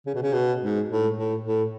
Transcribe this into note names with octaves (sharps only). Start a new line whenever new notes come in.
C#3
B2
C#3
B2
G#2
A2
A2
A2